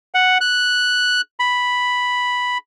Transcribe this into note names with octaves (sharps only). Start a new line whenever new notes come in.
F#5
F#6
B5